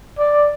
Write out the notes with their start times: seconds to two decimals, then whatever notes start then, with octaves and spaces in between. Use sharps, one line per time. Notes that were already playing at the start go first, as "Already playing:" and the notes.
0.18 D5